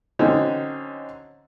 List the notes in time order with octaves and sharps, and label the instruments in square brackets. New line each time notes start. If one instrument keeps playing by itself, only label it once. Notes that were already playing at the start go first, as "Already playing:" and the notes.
[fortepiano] D3 F#3 C4 C#4 D#4